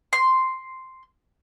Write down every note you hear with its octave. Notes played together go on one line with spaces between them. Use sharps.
C6